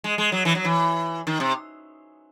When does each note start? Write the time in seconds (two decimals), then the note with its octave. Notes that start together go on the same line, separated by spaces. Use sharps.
0.04 G#3
0.18 G#3
0.32 F#3
0.45 E3
0.55 F#3
0.65 E3
1.27 D#3
1.40 C3